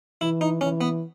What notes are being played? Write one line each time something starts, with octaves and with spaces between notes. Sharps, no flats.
E3 E4
D#4
E3 C#4
B3